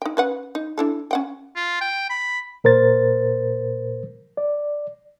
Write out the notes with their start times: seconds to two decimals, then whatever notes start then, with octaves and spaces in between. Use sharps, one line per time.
0.02 D#4 G5
0.17 C#4 B4 F#5
0.55 D#4
0.78 D4 E4 A4
1.11 C#4 F#5 G5
1.56 F4
1.81 G5
2.10 B5
2.64 A#2 A#4 C5 A6
4.37 D5